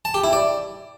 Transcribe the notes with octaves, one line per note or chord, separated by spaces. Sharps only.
A5
G4
E4
D5